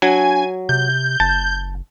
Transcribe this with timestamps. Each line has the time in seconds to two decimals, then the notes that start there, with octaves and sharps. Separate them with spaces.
0.02 F#3 D4 G#5
0.69 C3 G6
1.20 F#1 A5